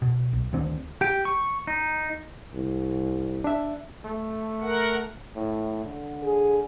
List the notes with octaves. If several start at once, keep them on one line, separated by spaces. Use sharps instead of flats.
B2
B1
D2 D#3 C4 D4
G4 G5
C#6
D#4
C2
D4 E5
A3
A#4 F#5
A2
D3
G#4